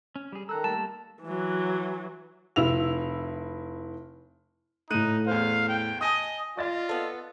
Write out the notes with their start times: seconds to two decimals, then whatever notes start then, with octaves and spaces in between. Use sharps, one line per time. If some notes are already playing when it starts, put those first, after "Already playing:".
0.16 C#4
0.32 G3 G#4
0.49 D#3 A4 A#5 E6 F#6
0.64 G3 A3 A#3 A5
1.23 E3 F#3
2.56 F1 E4 E6 F7
4.90 A2 A3 D#4 F#6 D#7
5.27 E2 C5 F5
5.68 G5
6.01 D#5 G#5 A5 D#6
6.57 F4 D5 D#5 A6
6.89 B3 A4